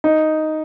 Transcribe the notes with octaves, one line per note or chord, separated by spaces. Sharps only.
D#4